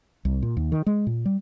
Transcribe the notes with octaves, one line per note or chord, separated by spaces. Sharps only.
C2
A#2
D#2
D#3
G#3
A#2
G3